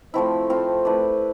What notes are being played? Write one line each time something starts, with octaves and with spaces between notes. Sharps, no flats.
F3 A3 C4 E4 C5
C4 F4 A4
A3 E4 B4 D5